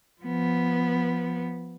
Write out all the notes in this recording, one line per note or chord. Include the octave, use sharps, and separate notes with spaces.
F3 B3